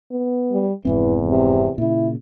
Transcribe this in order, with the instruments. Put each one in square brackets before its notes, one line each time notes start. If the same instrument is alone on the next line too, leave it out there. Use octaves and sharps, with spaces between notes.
[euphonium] B3
[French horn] G3
[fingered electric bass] F1 G#2 C4 [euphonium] E2 [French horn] E3
[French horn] C3
[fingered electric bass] A#2 C#3 [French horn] E4